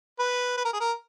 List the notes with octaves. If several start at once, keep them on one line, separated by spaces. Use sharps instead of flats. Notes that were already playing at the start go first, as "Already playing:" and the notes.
B4
B4
A#4
G#4
A#4